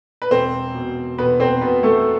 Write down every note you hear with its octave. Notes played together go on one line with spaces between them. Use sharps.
B4
E1 C4 C5
B2
E1 B3 B4
C4 C5
B2 B3 B4
A3 A4